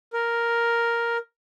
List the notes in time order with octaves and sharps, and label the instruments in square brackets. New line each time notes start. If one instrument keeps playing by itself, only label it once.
[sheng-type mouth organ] A#4